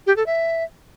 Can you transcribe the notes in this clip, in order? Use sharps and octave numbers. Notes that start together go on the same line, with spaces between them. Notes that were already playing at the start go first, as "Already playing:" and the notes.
G4
A4
E5